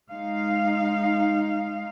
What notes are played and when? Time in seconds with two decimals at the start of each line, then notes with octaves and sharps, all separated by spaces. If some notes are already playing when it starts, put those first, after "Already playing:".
0.11 G#3 D#4 F5